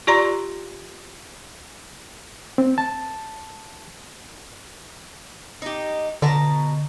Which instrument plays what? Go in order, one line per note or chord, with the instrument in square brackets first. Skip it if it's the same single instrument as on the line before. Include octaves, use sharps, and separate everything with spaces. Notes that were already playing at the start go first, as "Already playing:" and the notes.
[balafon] F4 G4 D5 A#5 C6
[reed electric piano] C4
A5
[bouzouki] D#4 G4
[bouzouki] B2 A5 A#5 [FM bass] D3